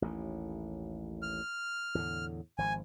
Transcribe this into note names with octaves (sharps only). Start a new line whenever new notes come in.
A1 D#2 A2
F6
E2 A2 D3
G#1 F3 G#5